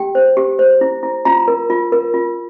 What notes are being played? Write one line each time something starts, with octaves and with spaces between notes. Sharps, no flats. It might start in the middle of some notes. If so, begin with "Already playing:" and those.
Already playing: G4 G5
C5
G4
C5
E4
E4
F4 A#5
A#4
F4
A#4
F4